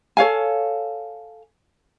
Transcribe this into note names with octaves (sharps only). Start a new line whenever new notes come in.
A4 C#5 F5 G#5